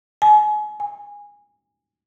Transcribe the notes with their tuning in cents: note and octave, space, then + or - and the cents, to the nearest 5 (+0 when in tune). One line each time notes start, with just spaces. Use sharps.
G#5 +30
G#5 -20